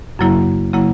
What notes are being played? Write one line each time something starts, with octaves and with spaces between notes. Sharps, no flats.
F#2 C#3 F#3 A#3 E4
C#3 F#3 A#3 E4